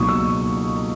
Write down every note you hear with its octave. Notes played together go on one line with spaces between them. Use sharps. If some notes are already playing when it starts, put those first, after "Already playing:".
Already playing: C#2 B2 F#3 A#3 D#4 C#6 D#6
E6